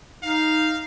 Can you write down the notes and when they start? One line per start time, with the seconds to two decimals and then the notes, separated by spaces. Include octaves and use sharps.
0.23 D#4 F5